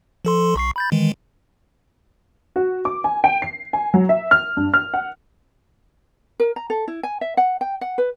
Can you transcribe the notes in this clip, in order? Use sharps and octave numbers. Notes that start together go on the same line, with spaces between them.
F3 A4 C6
B1 C#6 C7
B5 G6 A6
D#3 E3 G#3
F#4
D6
G#5
G5
C7
G#5
F#3
E5
F6
G2
F6
F#5
A#4
A#5
A4
E4
G#5
E5
F#5
G5
F#5
B4